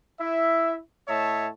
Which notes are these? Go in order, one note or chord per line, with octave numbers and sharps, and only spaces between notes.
E4 E5
A2 C#5 D#5 E5 A5